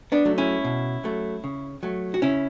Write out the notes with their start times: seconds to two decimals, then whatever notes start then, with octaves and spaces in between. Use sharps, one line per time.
0.12 B3 D4
0.25 F#3 A3
0.38 C#4 E4
0.64 B2
1.04 F#3 A3
1.44 C#3
1.83 F#3 A3
2.14 F#4
2.22 C#3 C#4 E4